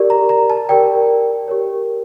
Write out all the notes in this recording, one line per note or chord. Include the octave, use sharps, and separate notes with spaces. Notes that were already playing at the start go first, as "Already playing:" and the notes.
Already playing: G4 A#4 D5
A#5
A#5
A5
G4 A#4 D5 G5
G4 A#4 C#5